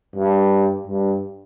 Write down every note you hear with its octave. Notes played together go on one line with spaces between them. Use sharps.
G2
G2